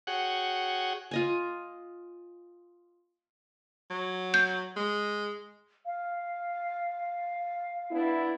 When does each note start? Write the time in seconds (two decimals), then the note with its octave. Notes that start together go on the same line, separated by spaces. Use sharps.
0.07 F#4 G#4 C#5 F#5 G5
1.11 F4 D#5 G#5
3.90 F#3
4.34 G6
4.76 G#3
5.86 F5
7.91 B3 D4 E4